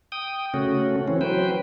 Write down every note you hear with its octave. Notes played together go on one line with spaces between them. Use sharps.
G5 D#6
C#3 A3 C#4 F#4
E3 C4 C#4
F#3 B4 C5 G5